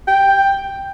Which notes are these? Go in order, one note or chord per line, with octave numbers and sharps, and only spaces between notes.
G5